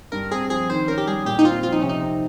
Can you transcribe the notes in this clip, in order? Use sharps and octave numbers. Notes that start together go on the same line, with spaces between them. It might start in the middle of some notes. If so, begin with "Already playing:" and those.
G2 A#4
C4 G#4
F3 G#4
D#3 C5
C#4 A#4
G4
G3 G#4
A#2 G4
D#4
C4 F4
F3 F4
D#4
C3 C#4
D#4
C4